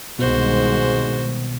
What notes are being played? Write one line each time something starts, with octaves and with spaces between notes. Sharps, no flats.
C2 G#2 B2 D#3 G#3 F#4 C5